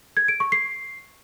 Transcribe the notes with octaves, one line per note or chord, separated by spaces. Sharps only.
G#6
D7
C#6
C7